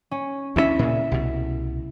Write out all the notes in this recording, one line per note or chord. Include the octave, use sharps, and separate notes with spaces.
C#4
D2 G#3 C#4 E4 E5
A#2 C#3
C2 B2